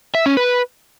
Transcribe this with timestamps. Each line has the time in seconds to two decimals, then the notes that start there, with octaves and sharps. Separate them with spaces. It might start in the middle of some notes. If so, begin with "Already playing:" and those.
0.15 E5
0.26 C#4
0.37 B4